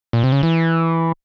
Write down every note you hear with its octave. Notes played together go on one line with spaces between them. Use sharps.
A#2
C3
C#3
E3